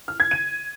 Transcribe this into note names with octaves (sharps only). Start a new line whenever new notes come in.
F6
G#6
D#7